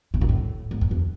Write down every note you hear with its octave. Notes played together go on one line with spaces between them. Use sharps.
A2
A#2
A2
G#2
E2
F2